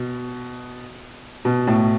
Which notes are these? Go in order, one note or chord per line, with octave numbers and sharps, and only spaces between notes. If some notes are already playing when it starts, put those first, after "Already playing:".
Already playing: B2
B2
A2